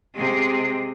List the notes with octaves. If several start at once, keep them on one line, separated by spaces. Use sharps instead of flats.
C3 G#3